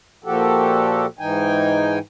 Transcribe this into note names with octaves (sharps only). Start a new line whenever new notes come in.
A#2 F3 F#4 G4 A4
G#2 E3 D#4 G5 G#5